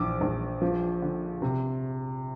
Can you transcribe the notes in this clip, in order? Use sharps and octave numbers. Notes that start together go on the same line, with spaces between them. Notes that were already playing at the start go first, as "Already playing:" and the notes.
Already playing: A#1 E3 D6
A#1
F3
D3
C3